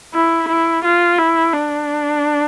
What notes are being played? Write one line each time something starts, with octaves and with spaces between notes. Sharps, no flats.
E4
E4
F4
E4
D4